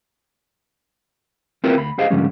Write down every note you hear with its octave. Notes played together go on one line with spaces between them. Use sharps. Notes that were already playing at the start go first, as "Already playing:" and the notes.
C4 E4 F4 G4 A#4 B4
D2 B5
G4 G#4 C5 D#5 F5
G#2 D3 F3 G3 G#3 C#4